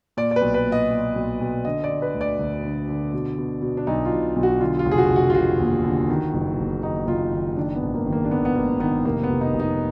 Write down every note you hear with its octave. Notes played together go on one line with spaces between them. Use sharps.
A#2 D5
D5
B1 B4
B4
A#2
D#5
A#2
B1
B1
D3 D#5
D5
D3
B4
D2
D5
D2
D3
D3
B2
B2
B2
D4
B1 D#4
F4
B1
B1
F#4
D3 F4
F4
F1
G#4
F#4
F1
F#4
F4
F1 F#4
D#2
D3
D#3
F#1
F#1
D#3 D#4
F#1 F4
D#3
D#3 D4
B3
G#1
A#3
D#3
A#3
D4
D#3 B3
B3
G#1 A#3
D#3 B3
F1 A#3
B3
F1
D#4
F1
D#4